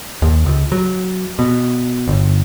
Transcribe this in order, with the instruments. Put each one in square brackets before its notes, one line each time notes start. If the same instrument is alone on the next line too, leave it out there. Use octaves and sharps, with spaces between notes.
[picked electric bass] D#2
C#2
F#3
B2
G1